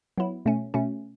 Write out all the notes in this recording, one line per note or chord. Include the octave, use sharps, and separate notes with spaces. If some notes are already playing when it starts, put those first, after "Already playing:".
F#3 B3 E4
B2 A3 C#4
B2 A3 C#4